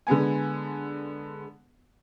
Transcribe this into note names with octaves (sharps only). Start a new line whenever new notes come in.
D3 G#3 B3 G#5